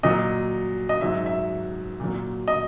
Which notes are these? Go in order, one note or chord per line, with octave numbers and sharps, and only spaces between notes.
A#2 F#3 D#5
D#5
G#2 F#3 E5
E5
A#2 F#3
D#5